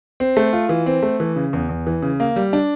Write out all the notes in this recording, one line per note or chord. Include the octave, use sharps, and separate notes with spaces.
C4
A3
F4
E3
C4
A3
E3
C#3
E2
E2
E3
C#3
A#3
G3
D4